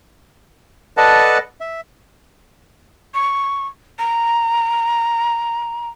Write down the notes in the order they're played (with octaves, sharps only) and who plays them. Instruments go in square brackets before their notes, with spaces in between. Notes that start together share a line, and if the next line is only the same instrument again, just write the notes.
[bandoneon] A4 B4 D5 D#5 F#5 A5
E5
[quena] C#6
A#5